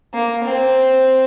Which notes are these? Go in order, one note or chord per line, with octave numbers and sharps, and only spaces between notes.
A#3
C4